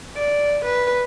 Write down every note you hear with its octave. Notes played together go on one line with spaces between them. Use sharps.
D5
B4